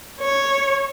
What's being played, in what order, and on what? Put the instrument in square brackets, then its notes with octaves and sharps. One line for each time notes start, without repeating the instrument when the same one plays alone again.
[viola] C#5